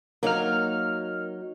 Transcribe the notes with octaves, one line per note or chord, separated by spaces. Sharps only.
F#3 A#3 D#4 F6